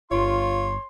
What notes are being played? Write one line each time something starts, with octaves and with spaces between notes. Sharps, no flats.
G1 F4 C#5 C6